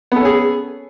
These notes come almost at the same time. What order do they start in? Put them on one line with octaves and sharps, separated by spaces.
B3 A4 C#4 G#4